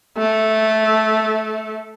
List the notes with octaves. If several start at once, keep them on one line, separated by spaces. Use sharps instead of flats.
A3